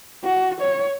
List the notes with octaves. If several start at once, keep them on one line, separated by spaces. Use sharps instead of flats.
F#4
C#5